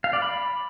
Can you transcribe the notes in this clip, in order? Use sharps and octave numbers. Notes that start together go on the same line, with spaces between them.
F5
D5
B5